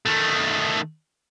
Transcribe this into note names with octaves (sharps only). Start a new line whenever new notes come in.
D#3 A3